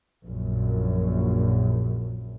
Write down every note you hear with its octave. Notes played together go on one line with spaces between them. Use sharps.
A#1 F#2